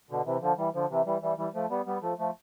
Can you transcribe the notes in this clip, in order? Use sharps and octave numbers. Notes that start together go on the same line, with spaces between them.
B2 D3
C3 E3
D3 F3
E3 G3
D3 F3
C3 E3
E3 G3
E3 G3
E3 G3
F3 A3
G3 B3
G3 B3
F3 A3
F3 A3